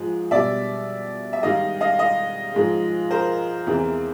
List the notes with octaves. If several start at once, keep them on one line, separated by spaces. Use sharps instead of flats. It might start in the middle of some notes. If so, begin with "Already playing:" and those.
Already playing: G#2 F3 G#3
B2 G3 D5 E5
E5
G#2 D#3 G3 D#5 F5
D#5 F5
D#5 F5
G#2 F3 G#3
A#4 C5
E2 C3 E3